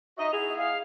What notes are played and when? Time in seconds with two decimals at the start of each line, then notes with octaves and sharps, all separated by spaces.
0.18 D#4 F#4 D#5 E5
0.32 B3 E4 G#4 F7
0.57 F5